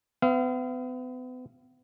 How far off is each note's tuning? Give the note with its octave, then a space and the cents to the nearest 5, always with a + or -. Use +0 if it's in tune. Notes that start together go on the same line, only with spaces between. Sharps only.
B3 +40 F5 -35